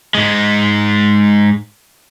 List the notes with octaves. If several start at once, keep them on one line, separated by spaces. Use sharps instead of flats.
G#2 G#3